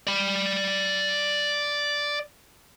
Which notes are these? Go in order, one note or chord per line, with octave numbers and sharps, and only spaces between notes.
D5 B5